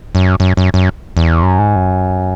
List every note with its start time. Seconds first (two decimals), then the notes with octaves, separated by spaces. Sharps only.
0.15 F#2
0.40 F#2
0.57 F#2
0.74 F#2
1.17 E2
1.42 F#2
1.59 G#2
1.76 F#2